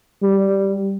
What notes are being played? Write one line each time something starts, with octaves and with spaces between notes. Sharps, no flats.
G3